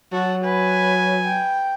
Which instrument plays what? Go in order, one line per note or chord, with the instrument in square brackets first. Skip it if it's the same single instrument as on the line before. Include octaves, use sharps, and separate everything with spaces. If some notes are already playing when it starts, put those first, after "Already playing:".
[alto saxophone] F#3 [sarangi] F#4 [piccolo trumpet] A5
[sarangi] B4 [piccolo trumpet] G#5
[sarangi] G5